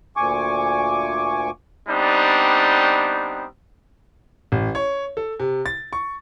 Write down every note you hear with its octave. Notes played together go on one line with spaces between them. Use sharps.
D2 A#2 G#5 C#6 D6
G3 B3 C4 D4 D#4
A1
C#5
A4
C3
A6
C#6